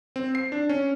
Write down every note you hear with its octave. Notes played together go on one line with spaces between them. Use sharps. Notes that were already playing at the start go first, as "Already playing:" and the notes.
C4
C7
D4
C#4